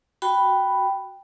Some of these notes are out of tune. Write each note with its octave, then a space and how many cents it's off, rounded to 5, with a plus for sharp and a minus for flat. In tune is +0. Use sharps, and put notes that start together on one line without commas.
F#4 +0 G5 +0 B5 +0